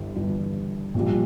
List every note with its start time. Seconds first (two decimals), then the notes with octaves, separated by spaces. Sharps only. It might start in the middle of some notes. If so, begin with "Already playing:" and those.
Already playing: G1 G2 E3 G3
0.15 G1 G2 E3 G3
0.94 A#1 A#2 G3